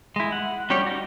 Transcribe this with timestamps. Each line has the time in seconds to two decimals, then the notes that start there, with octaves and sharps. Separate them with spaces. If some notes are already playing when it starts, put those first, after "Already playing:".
0.16 G#3 E4
0.32 F#5
0.70 G3 C#4 G4 C#5 D5
0.86 D#4 F#4